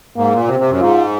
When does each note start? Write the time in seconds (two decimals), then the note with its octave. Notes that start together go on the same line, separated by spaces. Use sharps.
0.17 G#2 A#3
0.33 A#2
0.48 C3 C4
0.59 C3
0.69 F#2
0.80 G#2 F4